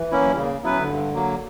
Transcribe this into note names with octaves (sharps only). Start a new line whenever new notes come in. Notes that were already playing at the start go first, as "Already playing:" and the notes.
Already playing: E3
A#3 C#4 E4
F#3
G3
C#3 A#3
F#3 B3 C#4 E4 B4
D3
G2
F#3 A#3